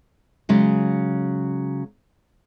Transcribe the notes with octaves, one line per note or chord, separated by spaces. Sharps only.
C#3 F#3 G#3